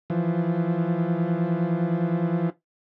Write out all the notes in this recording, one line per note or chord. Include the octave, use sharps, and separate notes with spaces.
E3 F3